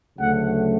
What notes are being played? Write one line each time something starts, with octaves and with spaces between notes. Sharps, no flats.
D2 C#3 F#3 A3 F#5